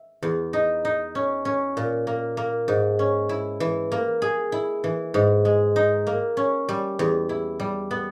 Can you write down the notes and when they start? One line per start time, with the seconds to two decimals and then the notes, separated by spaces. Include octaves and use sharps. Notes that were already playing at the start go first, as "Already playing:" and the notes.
Already playing: E5
0.23 E2
0.53 D#4
0.85 D#4
1.15 C#4
1.45 C#4
1.77 A#2
2.07 A#3
2.37 A#3
2.68 G#2
2.99 C#4
3.29 E4
3.60 E3
3.92 A#3
4.22 G#4
4.52 E4
4.84 E3
5.14 G#2
5.45 G#3
5.76 D#4
6.07 A#3
6.37 C#4
6.69 G3
6.99 E2
7.29 E4
7.60 G3
7.91 B3